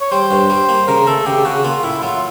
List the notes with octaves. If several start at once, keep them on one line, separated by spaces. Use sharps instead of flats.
C#5
G3 C5
G2
G3
A#3
C#3 A#4
A3 A4
C#3 G4
C#3 F#4
A#3 F4
A2 E4
F#3 F4